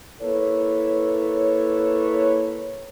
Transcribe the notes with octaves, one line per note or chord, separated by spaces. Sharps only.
A#3 E4 A4 B4 C#5